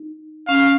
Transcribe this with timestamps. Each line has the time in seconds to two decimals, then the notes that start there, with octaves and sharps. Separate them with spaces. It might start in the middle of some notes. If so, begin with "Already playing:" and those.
Already playing: D#4
0.48 C#4 F5